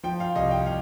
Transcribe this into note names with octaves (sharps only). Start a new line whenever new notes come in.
F3 G5
F5
C2 D#5
G5
F5